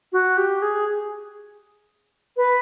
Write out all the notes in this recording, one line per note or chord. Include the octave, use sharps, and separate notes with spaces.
F#4
G4
G#4
B4